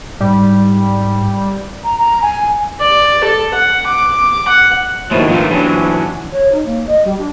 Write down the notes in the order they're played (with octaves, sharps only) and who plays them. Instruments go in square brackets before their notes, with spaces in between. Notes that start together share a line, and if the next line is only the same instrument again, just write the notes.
[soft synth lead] G#2 [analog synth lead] G3
[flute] A#5
A#5
G#5
[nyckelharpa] D5
A4
F#5
D6
F#5
[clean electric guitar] G#2 B2 F3 [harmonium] D#3 E4 C#5 [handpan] A3 A#3
[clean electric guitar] D#3 G#3 A3 [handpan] F3 B3 D4 [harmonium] F4
[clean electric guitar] E3 F#3 [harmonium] C#4 D4 [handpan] G4 C#5
[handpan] D3 F#5
[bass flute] C#5
D#4
A#3
D#5
G3
D4